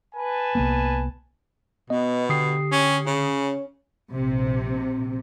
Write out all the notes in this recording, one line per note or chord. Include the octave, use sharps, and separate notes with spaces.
B4 G#5 A5
C2 A#3 B3
B2 B3 D#5
D3 G4 D#6 C7
C#4
C#3 C#4
A#1 C3